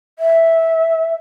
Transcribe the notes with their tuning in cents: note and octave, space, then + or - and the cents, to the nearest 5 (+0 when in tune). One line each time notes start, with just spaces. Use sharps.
E5 -5